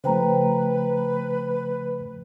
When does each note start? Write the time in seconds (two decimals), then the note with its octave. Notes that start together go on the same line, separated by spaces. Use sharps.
0.04 C#3 F3 A3 B4 C5 G5 A#5